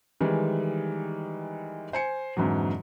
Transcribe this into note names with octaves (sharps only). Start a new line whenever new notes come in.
D#3 E3 G3 G#3
C5 G#5 C#7
F2 G#2 D3 E3 F#3